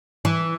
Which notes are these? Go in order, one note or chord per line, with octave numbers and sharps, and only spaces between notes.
E3